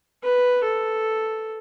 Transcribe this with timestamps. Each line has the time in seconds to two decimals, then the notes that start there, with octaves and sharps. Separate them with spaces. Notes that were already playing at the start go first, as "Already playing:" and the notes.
0.23 B4
0.64 A4